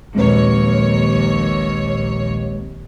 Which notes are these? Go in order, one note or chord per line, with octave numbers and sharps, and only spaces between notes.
A#1 D#2 G#3 C4 B4 C#5